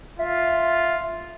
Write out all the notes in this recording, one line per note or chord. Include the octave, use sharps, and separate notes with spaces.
F4 E5